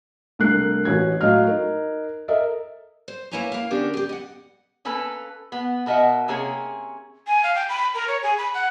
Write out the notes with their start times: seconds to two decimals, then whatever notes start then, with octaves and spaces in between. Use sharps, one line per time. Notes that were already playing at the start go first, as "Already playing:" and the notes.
0.39 C2 A3 D4 A#4 F#6 C7
0.85 A1 C#4 F#4 G#6
1.21 A2 F#3 D#5 F5 F6
1.47 D#4 A#4
2.28 A4 A#4 D#5 E5
3.08 C5
3.31 A#3 B3 E4 C#5 G#5 A#5
3.52 A#3 F5
3.71 D3 B3 C#4 D4 G4 A#4
3.94 G4 G#4
4.09 D#5 F#5
4.85 A#3 C#4 A4 B4
5.52 B3
5.86 B2 A#4 D#5 E5 F#5
6.28 C3 A#3 C#4 G#4 C#5
7.27 G#5
7.43 F5
7.55 G5
7.69 B5
7.94 A#4
8.08 C#5
8.23 G#4
8.38 B5
8.54 F#5